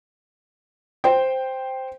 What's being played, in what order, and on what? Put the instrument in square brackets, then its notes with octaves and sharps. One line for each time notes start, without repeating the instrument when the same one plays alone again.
[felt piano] C5 G5